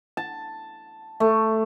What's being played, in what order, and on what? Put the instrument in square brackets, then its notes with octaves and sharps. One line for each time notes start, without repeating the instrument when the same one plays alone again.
[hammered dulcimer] A5
A3